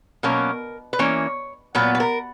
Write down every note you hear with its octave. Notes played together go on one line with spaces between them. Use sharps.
B2 F#3 A#3 C#4 A#4
B4
E3 A#3 C#4 C#5
A#2 F#3 B3 B4
B4
A#4